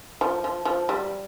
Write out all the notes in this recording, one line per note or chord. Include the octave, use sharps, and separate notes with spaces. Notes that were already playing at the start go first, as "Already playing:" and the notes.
F3
F3
F3
G3